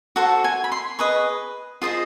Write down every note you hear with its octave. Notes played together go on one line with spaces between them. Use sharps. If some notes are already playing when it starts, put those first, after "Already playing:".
F#4 A4 C5 F#5
G#5
B5
C6
G#4 B4 D#5 C#6
F4 G#4 C5 D#5